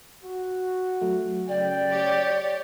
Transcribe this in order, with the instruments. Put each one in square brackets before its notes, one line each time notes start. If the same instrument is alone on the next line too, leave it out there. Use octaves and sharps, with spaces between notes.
[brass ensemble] F#4
[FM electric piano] F#3 A3
[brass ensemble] C#3 G5 [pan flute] D5
[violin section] G4 C#5